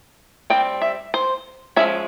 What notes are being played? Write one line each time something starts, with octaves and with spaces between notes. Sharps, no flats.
G3 C4 G5
E5
C5
F3 G#3 C#4 E5